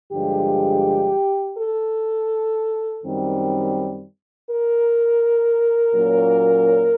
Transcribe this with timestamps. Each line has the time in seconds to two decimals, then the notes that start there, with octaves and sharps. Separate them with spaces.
0.13 G2 D3 F3 G#3 G4
1.58 A4
3.03 F#2 D#3 G3 C4
4.49 A#4
5.94 A#2 F#3 A#3 C#4